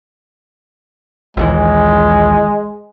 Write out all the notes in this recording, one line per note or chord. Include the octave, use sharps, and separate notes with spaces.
A#1 D#2 E3 G#3